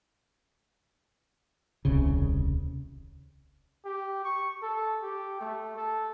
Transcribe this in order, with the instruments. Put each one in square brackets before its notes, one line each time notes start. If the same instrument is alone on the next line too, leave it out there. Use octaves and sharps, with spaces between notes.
[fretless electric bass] D#1 C2 C#3
[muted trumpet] G4
C#6
A4
G4
A3
A4